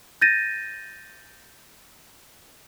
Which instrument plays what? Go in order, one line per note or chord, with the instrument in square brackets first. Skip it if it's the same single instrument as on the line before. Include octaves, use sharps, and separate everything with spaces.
[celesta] G6 A6 A#6 D#7